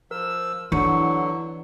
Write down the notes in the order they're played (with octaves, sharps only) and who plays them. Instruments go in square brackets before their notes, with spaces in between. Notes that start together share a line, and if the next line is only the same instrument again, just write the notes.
[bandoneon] F3 E6 [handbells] A#4
[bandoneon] D3 F#3 [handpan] E3 [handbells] D4 C#6 C#7 [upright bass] E4